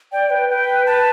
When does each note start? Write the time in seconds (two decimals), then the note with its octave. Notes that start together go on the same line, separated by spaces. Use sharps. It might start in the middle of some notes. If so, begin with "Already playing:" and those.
0.12 D5 G5
0.30 B4 G5
0.49 B4 G5
0.86 B4 A5